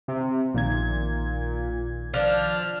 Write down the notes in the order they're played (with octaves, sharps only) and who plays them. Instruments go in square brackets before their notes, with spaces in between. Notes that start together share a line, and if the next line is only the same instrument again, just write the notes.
[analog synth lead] C3
[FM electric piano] A#1 D#3 G#6 [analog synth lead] A#2
[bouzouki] F3 D4 [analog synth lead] F6